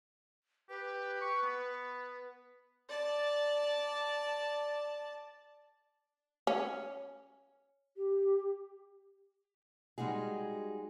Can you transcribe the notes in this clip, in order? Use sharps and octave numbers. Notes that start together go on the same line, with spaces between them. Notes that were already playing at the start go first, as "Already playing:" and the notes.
G4 B4
C#6
B3
D5 A5
C#4
G4
G3 G#3 D#4 F#4 G#4